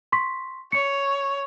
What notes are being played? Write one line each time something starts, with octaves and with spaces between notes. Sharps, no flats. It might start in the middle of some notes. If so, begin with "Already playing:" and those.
C6 C#6 B6
C#5 C#7